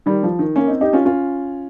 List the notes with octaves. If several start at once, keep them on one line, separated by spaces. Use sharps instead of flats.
D#3 G3
F3
D#3
A#3 C#4
C4 D#4
D#4 G4
C#4 F4
C#4 F4